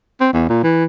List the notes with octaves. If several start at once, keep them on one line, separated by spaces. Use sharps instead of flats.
C4
E2
A#2
E3